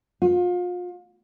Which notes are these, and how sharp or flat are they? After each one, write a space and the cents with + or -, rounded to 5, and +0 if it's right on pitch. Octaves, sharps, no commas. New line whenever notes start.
F4 +35